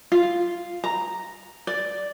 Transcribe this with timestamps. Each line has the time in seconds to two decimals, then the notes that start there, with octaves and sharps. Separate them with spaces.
0.12 F4
0.84 A#5
1.67 D5